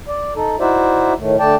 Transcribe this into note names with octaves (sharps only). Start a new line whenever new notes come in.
D5
D#4 A4
D#4 E4 F#4 C5 D5 E5
A2 D#3 A3
D3 A3 D5 G5 A5